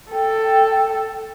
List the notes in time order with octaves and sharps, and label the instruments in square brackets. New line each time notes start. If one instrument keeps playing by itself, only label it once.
[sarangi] A4 [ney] G5